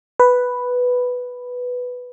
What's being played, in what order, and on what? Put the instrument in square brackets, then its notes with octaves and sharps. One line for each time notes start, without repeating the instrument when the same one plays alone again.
[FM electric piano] B4